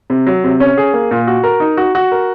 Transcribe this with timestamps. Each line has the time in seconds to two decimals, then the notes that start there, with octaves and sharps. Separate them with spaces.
0.10 C3
0.27 F#3
0.44 C3
0.60 C#4
0.77 G#4
0.93 A#3
1.11 A#2
1.27 F#4
1.44 A#4
1.60 D#4
1.77 F#4
1.95 F#4
2.12 A#4